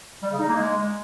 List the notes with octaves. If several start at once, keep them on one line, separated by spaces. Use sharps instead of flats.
G3
C#3
D#4
A#3
G#3